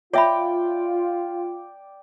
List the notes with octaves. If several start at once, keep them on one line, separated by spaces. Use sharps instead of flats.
F4 C#5 D5 E5 G5 B5